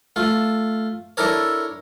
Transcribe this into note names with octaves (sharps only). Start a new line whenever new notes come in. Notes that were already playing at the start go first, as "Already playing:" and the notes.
A3 F4
D4 E4 A4 A#4 C#5